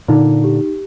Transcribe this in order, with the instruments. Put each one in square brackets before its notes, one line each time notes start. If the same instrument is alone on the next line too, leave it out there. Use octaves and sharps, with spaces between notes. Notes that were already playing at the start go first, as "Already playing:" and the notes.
[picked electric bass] A#2 D3 [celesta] D#4
[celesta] G4